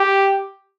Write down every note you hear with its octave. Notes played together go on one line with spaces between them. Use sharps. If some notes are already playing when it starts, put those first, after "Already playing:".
Already playing: G4